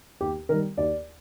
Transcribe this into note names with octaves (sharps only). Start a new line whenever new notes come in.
D#2 G4
D#3 G3 A#4
D#2 D5